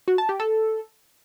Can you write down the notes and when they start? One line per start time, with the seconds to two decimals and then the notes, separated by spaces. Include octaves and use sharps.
0.08 F#4
0.18 A5
0.29 G4
0.40 A4